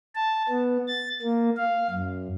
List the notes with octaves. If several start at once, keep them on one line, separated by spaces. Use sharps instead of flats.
A5
B3
A6
A#3
F5
F#2